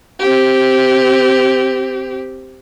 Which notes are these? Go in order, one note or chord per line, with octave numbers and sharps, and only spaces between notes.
C4 G4